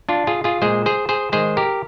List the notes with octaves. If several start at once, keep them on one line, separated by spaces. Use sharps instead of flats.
D4 F4
F4 G#4
F4 G#4
A#2 G#3 G#4 C5
G#4 C5
G#4 C5
D#3 G#3 G#4 C5
G4 A#4